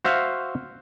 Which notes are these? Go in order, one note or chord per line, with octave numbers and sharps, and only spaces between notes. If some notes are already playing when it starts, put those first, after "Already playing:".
F#4 C5 E5 F5